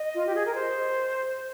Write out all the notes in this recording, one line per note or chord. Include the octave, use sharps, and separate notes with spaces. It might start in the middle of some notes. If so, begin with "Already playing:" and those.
Already playing: D#5
F4
G4
G#4
A#4
C5